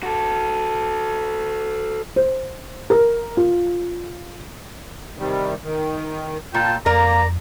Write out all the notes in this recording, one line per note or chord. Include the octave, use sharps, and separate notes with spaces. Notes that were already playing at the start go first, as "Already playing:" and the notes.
F#4 A4
C5
A#4
F4
C3 D#3 G3
D#3
A#2 F4 G5 A5
F2 A#3 A#4 D5 A#5